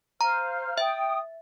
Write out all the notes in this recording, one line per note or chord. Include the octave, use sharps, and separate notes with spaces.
C5 F5 A#5 F6
E5 G5 D#6